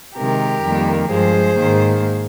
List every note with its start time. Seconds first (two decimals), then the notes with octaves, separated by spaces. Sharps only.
0.16 C3 D#3 G#3 G4 A#4
0.63 F2 D#3 G3 A#3
1.10 G2 F3 G#3 G#4 C5
1.57 G#2 D#3 A#3